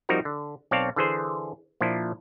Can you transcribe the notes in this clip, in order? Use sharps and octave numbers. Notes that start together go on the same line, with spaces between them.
F3 G3 C4 D#4 F#4 A#4
D3
B1 C4 C#5 D5 F5 A5
D3 E3 G#4 C5
A#2 F3 D4 E4